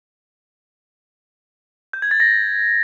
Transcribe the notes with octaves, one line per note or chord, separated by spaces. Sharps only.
G6
G#6
A6
A#6